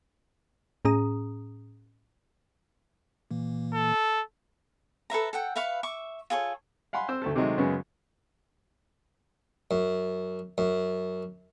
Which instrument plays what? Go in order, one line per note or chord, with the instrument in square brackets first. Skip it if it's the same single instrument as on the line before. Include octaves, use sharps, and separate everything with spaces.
[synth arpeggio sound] A2 C#4 G#4 A#5 D#6
[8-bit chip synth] A#2 E3 A#3
[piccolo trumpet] A4
[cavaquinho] A4 B4 E5 A#5
A4 F#5 G5
B4 E5 F5 C#6
E5 C#6 D6
F4 G#4 A4 C#5
[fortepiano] F5 F#5 G#5 B5 C6
C4 C5 E6
D2 A3 A4
C3 D#3 F#3 G#3 A3
F#2 C#3 G#3 B3 C#4
[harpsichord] F#2
F#2